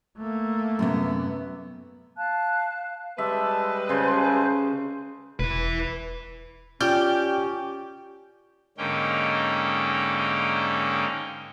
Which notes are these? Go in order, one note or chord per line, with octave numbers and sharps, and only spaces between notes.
A3 A#3
F#2 C3 B3
F5 A5 F#6
G3 G#3 B4 E5 A5 C6 D6
C#3 C5 A5 C6 G6
E1 E4 B4
C#4 F4 G4 D5 G5 G6
G#2 D3 A#3 C#4 D#4 G5